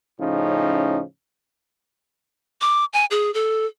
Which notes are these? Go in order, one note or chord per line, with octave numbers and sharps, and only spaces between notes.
A2 C#3 F3 C#4 D#4
D6
G#5
G#4
A4